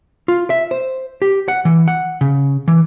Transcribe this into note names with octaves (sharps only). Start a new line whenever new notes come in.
F4
E5
C5
G4
F#5
E3
F#5
C#3
E3